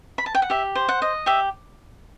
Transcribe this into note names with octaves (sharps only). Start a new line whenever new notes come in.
B5
A5
G5
F#5
G4 E5
C5
F#5
D#5
G4 E5